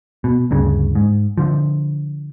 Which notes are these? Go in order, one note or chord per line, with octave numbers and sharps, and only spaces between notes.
B2
D2 G2 C#3
G#2
D3 F3